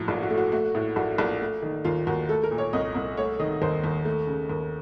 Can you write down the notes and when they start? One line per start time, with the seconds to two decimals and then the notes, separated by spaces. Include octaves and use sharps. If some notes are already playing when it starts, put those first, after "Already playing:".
Already playing: A2 F3 F#3 F#4
0.08 A#1
0.23 F#4
0.30 A3
0.38 F#4
0.52 A3 F#4
0.75 A2
0.96 A#1 F#4
1.18 A#1
1.41 A3
1.62 D#3
1.85 D#2 F4
2.07 D#2 F#4
2.29 A3 A4
2.43 A#4
2.51 A#2
2.58 C#5
2.73 C2 D#5
2.95 C2
3.17 A3 C#5
3.39 D#3 D#5
3.62 D#2 C5
3.84 D#2
4.05 A3
4.27 C#3
4.50 D#2